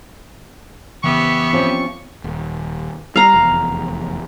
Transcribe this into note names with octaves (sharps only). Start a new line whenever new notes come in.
F2 C#3 E3 B3 G4 E5 C#6
F3 C4 C#4
D#1
G3 F5 A#5
F1 E2